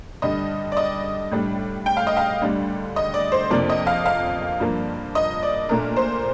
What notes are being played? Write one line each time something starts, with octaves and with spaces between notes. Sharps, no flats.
G2 D3 G3 D#5
D5
D#5
A2 G3 D4
G5
F5
D#5
F5
D2 D3 G3 D4
D#5
D5
C5
F2 C3 F3 A#3 D4 D5
D#5
F5
F5
G2 F3 A#3
D#5
D5
A#2 A3 D4 A#4
C5